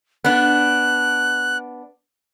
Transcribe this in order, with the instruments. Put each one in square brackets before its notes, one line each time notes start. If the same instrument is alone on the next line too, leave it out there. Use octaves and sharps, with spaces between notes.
[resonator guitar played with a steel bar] B3 D4 [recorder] F#6